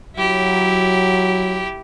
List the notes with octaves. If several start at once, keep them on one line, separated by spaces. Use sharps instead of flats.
F#3 E4 G4